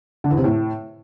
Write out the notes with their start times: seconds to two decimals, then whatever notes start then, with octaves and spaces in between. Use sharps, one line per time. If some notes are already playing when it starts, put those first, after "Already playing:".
0.24 D3
0.31 E2
0.37 C3
0.44 A2